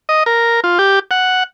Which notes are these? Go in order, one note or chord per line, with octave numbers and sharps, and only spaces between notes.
D#5
A#4
F4
G4
F#5